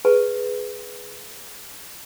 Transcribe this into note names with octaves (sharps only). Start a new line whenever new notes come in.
G#4 B4 A5 C#6